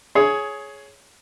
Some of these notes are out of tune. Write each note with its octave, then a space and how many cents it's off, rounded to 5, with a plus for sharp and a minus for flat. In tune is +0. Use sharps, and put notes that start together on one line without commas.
G#4 +15 C#5 +0